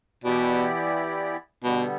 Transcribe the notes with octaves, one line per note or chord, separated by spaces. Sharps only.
B2 E3 B3 E4 G4 D5
B2 D3 G3 B3